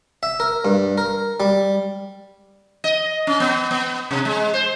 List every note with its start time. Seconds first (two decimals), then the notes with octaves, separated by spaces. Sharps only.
0.23 E5
0.40 A#4
0.65 G2
0.98 A#4
1.40 G3
2.84 D#5
3.27 C#4
3.40 B3
3.71 B3
4.11 C3
4.25 G#3
4.54 C5